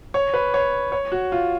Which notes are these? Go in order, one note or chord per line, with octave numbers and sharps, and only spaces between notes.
C#5
B4
C#5
C#5
F#4
F4